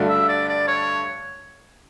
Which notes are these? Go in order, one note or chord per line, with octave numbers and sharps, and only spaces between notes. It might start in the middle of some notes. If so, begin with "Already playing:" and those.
Already playing: G2 D3 A3 D4 F#4
E5
D5
D5
C#5